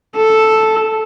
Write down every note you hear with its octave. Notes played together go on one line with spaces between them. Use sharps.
A4